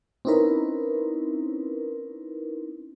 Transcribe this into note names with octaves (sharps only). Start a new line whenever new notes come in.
C4 C#4 D#4 E4 A#4 B4